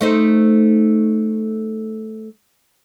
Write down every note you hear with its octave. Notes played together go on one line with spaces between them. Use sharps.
A3 D#4 C5